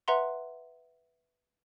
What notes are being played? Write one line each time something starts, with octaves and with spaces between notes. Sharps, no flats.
B4 E5 F#5 A#5 C6